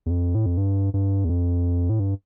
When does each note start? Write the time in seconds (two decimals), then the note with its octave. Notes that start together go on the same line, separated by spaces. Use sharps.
0.06 E2
0.10 F2
0.35 A2
0.46 F2
0.57 G2
0.94 G2
1.25 E2
1.29 F2
1.90 A2
2.00 G2